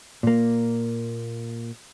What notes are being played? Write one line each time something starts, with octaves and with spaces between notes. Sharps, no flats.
A#2 A#3